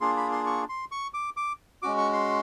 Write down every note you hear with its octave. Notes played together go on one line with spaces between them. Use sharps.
A#3 D4 F4 G#4 C6
B5
C6
C#6
C6
C#6
D6
D6
G#3 C#4 F#4 D6
C#6
C6